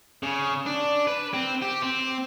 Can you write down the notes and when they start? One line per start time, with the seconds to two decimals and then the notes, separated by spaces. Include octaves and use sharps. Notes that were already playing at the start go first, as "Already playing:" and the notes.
0.23 C#3
0.66 D4
1.07 B4
1.34 C4
1.62 G4
1.82 C4